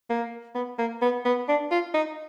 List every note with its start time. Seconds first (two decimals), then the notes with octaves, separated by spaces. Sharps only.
0.10 A#3
0.55 B3
0.79 A#3
1.02 B3
1.25 B3
1.49 D4
1.71 F4
1.94 D#4